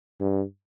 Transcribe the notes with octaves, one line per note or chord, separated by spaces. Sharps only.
G2